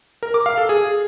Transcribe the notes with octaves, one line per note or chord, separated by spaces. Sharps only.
A#4
D6
F5
A4
G#4